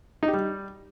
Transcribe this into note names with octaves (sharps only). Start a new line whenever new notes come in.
D#4
G4
G3